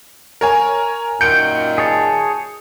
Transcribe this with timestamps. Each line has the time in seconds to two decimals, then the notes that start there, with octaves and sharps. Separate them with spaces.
0.41 A#4 C#5 G#5
1.21 F#2 A#2 D#3 G6 C#7 D7
1.78 G#4 C#5 A5